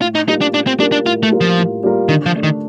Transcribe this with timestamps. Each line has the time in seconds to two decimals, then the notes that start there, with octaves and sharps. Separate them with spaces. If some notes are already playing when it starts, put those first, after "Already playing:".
0.02 A2 F4
0.15 D#4
0.28 G3 A#3 D#4 F4 A#4
0.41 D4
0.54 A2 D4
0.67 C4
0.79 G3 A#3 D4 F4 A#4
0.92 D4
1.06 A2 F4
1.23 A3
1.31 G3 A#3 F4 A#4
1.41 F3
1.58 A2
1.83 G3 A#3 F4 A#4
2.09 D3 D#3
2.26 F3
2.35 A3 D4
2.43 D#3